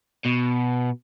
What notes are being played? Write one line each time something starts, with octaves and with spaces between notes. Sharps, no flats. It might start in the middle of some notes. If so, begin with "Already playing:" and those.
B2